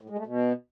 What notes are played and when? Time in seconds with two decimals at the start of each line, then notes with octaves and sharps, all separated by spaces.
0.01 A2
0.10 G#3
0.18 A3
0.27 B2